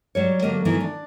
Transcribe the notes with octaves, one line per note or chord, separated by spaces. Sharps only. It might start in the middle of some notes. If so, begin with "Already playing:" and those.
F#3 G3 C#5
D3 F#3 A#3 G4 A#4 D#5
D#3 E3 F#3 A3 B3 B4
D4